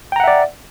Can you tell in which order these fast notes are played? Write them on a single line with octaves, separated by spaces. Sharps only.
G5 A#5 F#5 E5 D5